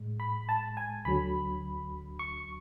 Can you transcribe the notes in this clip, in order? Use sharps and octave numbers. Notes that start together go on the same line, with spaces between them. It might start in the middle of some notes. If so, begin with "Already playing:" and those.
Already playing: A2 G#3
B5
A5
G#5
D2 D3 F#3 B5
C#6